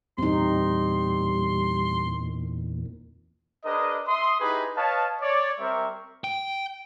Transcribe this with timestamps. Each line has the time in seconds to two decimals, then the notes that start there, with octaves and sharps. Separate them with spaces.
0.18 E2 A#2 G3 C4 D#4 C6
3.65 D4 G#4 A#4 B4 D#5
4.07 E5 C6 D#6
4.40 D#4 E4 G4 G#4 B4
4.76 B4 C#5 D#5 F5 A5
5.21 C#5 D5
5.59 G3 C4 A#4 C5 E5 C#6
6.24 G5